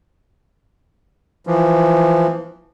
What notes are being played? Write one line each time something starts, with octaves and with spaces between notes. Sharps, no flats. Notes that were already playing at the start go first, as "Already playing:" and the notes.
E3 F3